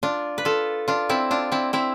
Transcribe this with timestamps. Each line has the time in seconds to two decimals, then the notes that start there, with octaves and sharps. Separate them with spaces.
0.03 D4 F4
0.38 B4
0.45 F4 A4
0.88 D4 F4
1.09 C4 E4
1.31 D4 F4
1.52 C4 E4
1.73 C4 E4